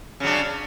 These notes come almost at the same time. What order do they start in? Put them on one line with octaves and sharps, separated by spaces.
C#3 F#3 D4